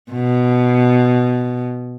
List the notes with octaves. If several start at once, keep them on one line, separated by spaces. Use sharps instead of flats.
B2